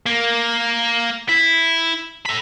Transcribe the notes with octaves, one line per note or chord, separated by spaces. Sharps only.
A#3
E4
A4 B5